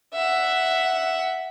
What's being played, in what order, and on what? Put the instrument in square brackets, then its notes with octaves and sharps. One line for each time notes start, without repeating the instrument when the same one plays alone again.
[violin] E5 F#5